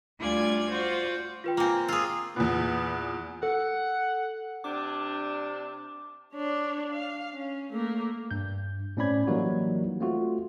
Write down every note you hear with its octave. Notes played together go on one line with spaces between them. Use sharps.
D2 G3 F4 D5 G#5 G#6
F4 F#4 C5 D5
F4 B4 G5
A#3 C4 F4 G#5
F4 G#4 D#6 E6
E2 A#2 B3
A4 F#5
C3 D4 D6
D4 C#5
F5
C#4
A3 A#3
G2 G6
A2 C4 C#4 D5 B5 G#6
E3 F#3 G3 A#3 D#4 F#4
A3 C4 F4 F#4